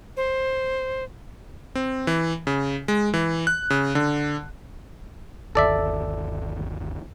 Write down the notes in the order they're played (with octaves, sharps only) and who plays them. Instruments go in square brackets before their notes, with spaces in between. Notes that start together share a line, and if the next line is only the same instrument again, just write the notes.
[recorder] C5
[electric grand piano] C4
E3
C#3
G#3
E3
F#6
C#3
D3
[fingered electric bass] G1 D#2 [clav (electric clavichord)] A4 D5 E5